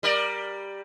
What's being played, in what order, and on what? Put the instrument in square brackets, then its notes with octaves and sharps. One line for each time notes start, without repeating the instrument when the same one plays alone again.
[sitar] G3 A#4 D5